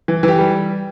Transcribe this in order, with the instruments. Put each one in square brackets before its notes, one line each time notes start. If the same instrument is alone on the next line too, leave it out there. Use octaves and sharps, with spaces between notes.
[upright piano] E3
E3 G4
G3